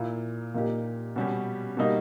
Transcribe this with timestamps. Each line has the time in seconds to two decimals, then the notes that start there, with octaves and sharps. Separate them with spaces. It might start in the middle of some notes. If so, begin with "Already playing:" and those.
Already playing: A#2 A#3 E4
0.54 A#2 A#3 D#4 G4
1.16 B2 G3 C#4 G4
1.77 B2 G3 A#3 D#4